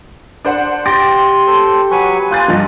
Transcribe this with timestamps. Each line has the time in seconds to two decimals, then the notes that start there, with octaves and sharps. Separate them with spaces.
0.45 D4 C5 F#5
0.86 G4 C6 A6 A#6 D7
1.47 A4 C5
1.91 F#3 B4 G#5 C#6
2.31 A#3 F4 C6 F#6 A6
2.48 G2 F3 D#5